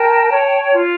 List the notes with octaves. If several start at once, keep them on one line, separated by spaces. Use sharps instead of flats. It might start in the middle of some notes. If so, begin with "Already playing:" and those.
Already playing: A#4 G5 A5
C#5
F4